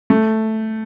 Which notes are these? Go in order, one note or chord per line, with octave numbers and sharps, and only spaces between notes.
A3